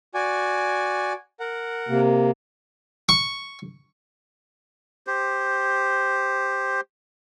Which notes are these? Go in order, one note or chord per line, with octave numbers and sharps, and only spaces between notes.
F#4 D5 G#5
A#4 F#5
C3 A#3
C#6
G4 C5